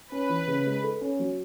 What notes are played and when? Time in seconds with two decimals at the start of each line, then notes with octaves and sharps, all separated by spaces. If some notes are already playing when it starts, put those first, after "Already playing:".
0.11 C#4 B4
0.29 E3
0.47 C#3
0.66 G#3
0.84 A4
1.01 C#4
1.19 F#3